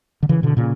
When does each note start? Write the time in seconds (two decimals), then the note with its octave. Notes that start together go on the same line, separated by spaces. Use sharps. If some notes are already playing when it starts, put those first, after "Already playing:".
0.23 D3
0.29 C#3 E3
0.43 B2 D3
0.57 A#2 C#3